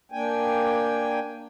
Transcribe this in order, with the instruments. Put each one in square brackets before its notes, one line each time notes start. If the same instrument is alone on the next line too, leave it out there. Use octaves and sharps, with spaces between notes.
[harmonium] A#3 D4 G5 G#5